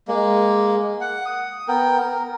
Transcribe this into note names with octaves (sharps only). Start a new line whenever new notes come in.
G#3 A#3
F#5
D#6
B3 A#4 G5
A#4